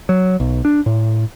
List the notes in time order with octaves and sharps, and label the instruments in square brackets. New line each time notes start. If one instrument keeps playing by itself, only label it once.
[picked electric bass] F#3
B1
D4
A2